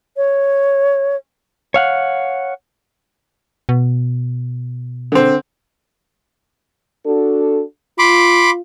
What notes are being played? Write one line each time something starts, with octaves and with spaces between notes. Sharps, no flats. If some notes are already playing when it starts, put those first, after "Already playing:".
C#5
C#5 F5 F#5
B2
D3 C4
D4 F#4 A4
F4 B5 C6 D6